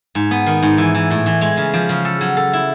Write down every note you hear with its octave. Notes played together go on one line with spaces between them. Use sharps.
G#2
B3
D#3
G#2
E3
E3
A2
E3
G#3
C#3
F3
C#3
A4
F#3
A4
E4